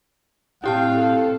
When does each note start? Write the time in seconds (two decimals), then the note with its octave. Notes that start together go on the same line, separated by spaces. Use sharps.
0.64 A2 C4 E4 G4 F5 G5 A5
0.99 A4